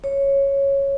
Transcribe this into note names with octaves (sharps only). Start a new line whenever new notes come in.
C#5